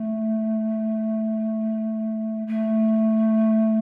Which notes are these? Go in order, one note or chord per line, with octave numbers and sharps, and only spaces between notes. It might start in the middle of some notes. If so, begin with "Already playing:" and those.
Already playing: A3
A3